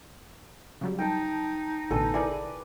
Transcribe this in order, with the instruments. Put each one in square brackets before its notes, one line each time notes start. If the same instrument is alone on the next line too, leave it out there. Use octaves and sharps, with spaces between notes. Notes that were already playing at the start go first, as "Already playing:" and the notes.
[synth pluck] C#3 F#3 G3
[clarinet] D#4 [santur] G5 A5
[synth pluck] A1 B2 D3 [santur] A4 B4 G#5
[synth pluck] E4 G#4 A#4 [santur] B4 D5 G#5